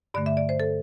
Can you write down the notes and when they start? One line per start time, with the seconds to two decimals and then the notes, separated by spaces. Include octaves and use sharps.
0.14 G2 D3 A3 D5
0.26 E5
0.37 D5
0.49 C5
0.60 A4